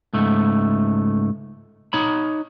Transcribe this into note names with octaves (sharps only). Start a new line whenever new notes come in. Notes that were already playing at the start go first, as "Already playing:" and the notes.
C#2 G#2 A3
D#4 C#5 B5